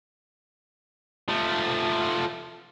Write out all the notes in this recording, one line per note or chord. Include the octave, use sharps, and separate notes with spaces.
F3 A3